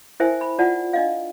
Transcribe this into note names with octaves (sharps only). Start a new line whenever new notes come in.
E4 A#4 C5 E5 G5 G#5
B5
F4 D5 F#5 A5
D4 D#5 F5